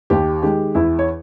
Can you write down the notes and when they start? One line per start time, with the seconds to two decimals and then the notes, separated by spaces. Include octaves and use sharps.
0.10 D#2 G4
0.42 D#3 G#3 G4
0.75 E2 E4
0.99 C#5